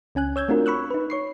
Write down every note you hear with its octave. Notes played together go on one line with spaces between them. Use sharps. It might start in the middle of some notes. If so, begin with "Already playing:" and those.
C#2 C#4 G#5 F#6
C#5 E6 G6 G#6
A3 C4 D4 F4 F#4 A#4
B5 C#6 E6 F#6
D#4 B4
C#5 C#6 C7